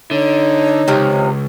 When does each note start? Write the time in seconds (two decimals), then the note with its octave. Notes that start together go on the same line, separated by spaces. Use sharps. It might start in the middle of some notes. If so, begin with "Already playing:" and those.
0.11 D3 D#4 C#5
0.88 C#2 C3 D#3 F3